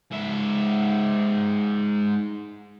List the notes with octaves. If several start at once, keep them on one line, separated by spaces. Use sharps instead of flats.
G#2 E5